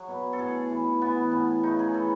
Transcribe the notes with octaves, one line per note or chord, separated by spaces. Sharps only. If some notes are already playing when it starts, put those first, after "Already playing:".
Already playing: F#3 G#4
B2
A4
A2 G#4
E3
E3 B3
A2
C#3 D#4
G#4
E3 A4